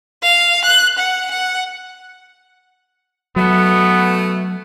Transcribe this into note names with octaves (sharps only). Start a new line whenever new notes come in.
F5
F#6
F#5
F#5
B2 F#3 A3 B3